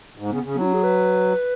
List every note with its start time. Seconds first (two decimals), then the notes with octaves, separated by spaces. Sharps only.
0.18 G#2
0.30 C#3 B3
0.43 C#3
0.55 F#3 B3
0.61 E4
0.65 C#4
0.73 G#4
0.83 B4